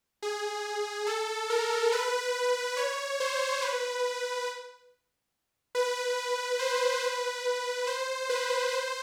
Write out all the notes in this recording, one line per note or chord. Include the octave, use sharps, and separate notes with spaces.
G#4
A4
A#4
B4
C#5
C5
B4
B4
C5
B4
C5
B4
C5